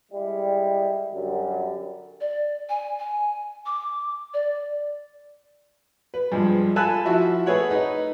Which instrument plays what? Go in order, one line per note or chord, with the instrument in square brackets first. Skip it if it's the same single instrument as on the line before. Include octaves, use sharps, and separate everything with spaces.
[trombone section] G3 G#3 E4
F#2 D3 G3
[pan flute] D5
G#5
G#5
D6
D5
[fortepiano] B4
G2 F3 G#3
F4 A4 G#5 A5 B5 F#6
F3 E4 F#4 E5
A3 G#4 B4 C#5 F#5
D#4 B4